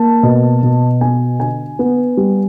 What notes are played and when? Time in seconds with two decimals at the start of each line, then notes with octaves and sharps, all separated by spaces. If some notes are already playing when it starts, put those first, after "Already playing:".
Already playing: A#3 A5
0.23 B2
0.63 B2
1.01 B3 G#5
1.40 D3 G#5
1.79 B3
2.17 G3